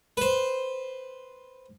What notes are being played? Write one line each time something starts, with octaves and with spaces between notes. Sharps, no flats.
B4 C5